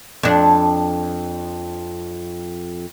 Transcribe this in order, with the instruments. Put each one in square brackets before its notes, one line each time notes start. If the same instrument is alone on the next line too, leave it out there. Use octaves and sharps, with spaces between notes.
[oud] F2 D4